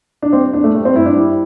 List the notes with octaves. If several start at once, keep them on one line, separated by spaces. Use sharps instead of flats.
D4
G3 C4
E2 D4
A3
G3 A3
C4
G2 E4
D4
G3 E4